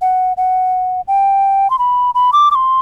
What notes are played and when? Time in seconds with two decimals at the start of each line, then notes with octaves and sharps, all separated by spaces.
0.01 F#5
0.37 F#5
1.08 G5
1.70 C6
1.79 B5
2.15 B5
2.33 D6
2.51 D6
2.55 C6